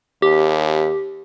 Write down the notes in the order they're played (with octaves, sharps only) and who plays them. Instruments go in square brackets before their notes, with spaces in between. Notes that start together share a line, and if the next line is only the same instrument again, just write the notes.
[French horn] D#2 [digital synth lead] G4